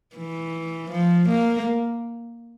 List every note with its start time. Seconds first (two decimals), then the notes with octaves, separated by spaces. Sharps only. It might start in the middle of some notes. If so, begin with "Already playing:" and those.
0.15 E3
0.91 F3
1.28 A#3